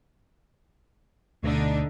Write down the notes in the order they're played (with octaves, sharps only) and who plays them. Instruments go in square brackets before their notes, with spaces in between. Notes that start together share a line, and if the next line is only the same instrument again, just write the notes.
[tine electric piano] D2 B2 A3 [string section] D3 D4 D#4